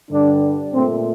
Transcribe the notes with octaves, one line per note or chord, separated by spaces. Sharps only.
G2 D3 G3 D4
A#2 A3 C4